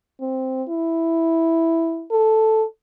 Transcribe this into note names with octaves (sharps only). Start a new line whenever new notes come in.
C4
E4
A4